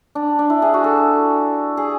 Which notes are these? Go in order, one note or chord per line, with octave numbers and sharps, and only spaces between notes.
D4
D4
E4
G#4
F#4
A4
G#4